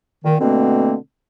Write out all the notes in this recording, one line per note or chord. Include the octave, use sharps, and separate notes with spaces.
A#2 D#3
B2 D3 A3 A#3 C4